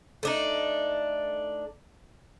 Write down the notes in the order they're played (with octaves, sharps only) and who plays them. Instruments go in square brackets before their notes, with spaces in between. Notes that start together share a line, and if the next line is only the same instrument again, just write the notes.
[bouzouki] A3 D4 D#4